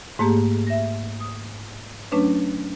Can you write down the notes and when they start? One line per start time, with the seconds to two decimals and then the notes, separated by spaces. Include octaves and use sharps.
0.19 G#2 A3 A#3 G4 G#4
0.67 E5 A#6
1.20 D#6
2.11 F#3 A3 C#4 D4 B4 C#5